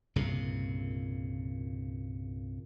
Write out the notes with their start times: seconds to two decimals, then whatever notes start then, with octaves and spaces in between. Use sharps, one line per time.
0.16 C2 G2 A#2 C#3